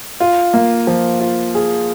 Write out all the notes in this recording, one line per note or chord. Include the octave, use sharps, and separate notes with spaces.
F4
A#3
F3
F4
G#4